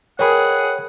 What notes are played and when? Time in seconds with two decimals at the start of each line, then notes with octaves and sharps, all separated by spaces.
0.19 G#4 A#4 B4 C#5 D#5 F#5 G5 B5